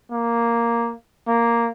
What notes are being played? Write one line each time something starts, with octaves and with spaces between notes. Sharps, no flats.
A#3
A#3